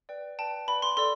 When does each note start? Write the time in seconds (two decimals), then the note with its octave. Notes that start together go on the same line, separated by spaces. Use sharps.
0.09 B4 D5 G5
0.39 B4 D5 G5 A5
0.68 B4 D5 G5 B5
0.82 C6
0.97 A4 D5 C6